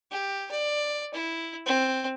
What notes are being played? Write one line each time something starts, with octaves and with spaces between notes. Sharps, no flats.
G4
D5
E4
C4